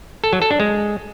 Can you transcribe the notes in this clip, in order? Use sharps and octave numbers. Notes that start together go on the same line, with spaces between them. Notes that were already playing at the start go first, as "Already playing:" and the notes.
A4
F#3
A4
D4
G#3